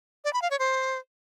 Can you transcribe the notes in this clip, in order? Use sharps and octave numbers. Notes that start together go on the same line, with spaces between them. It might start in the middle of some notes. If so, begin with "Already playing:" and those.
D5
B5
F5
C#5
C5